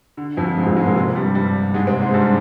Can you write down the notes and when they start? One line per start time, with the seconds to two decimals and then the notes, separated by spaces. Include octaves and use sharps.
0.17 D3
0.37 F2 F3
0.57 G#2 G#3
0.66 F2 F3
0.76 G#2 G#3
0.86 A#2 A#3
0.96 C3 C4
1.15 G2 G3
1.35 G2 G3
1.74 G#2 G#3
1.87 C3 C4
2.00 G#2 G#3
2.14 G2 G3